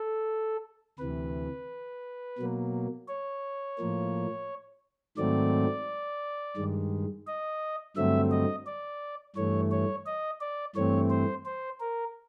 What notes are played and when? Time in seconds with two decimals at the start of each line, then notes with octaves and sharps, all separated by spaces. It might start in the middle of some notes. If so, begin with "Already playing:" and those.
Already playing: A4
0.99 D2 C3 E3 B4
2.38 B2 F#3 A#3
3.08 C#5
3.78 A2 F3 A#3
5.17 G#2 D#3 F#3 A3 C4 D5
6.57 G2 D#3 G#3
7.27 D#5
7.97 G2 D3 F#3 A3 C4 E5
8.31 D#5
8.66 D5
9.36 G2 E3 A3 C#5
9.71 C#5
10.06 D#5
10.41 D5
10.76 G2 E3 A3 C4 C#5
11.10 C5
11.45 C5
11.80 A#4